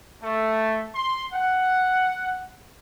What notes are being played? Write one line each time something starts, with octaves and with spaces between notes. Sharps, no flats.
A3
C6
F#5